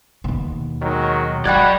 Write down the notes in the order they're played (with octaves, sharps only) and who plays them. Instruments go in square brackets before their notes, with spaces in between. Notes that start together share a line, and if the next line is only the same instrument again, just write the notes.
[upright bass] D#2 B2
[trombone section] D#3 F#3 G#3
[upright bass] F#3 [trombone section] G#3 F#4 [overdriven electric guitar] D5 B5 [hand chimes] G5 F#6 G#6